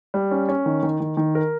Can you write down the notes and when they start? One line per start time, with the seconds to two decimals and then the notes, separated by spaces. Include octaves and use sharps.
0.14 G3
0.31 C#4
0.49 C#4
0.66 D#3
0.83 D#3
1.00 D#3
1.17 D#3
1.35 A#4